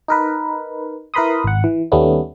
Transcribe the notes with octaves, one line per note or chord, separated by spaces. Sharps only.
D#4 A#4 B4
E4 A#4 B4 B5 C6 D#6
G#1 F#5
E3
D#2 G3 A3 B3 C#4